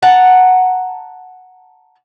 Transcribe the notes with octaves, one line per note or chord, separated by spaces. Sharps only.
F#5 A5 A#5